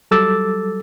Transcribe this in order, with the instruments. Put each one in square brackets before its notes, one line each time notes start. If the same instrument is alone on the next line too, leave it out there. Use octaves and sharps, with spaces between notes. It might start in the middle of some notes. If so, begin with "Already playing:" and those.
[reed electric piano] F#3 G3 A4 D6 E6 A6